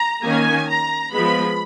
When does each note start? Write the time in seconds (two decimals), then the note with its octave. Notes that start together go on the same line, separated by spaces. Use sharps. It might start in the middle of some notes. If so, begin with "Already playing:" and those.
Already playing: A#5
0.24 D#3 A#3 C#4 G#5
0.68 A#5
1.13 F3 G#3 B3 B5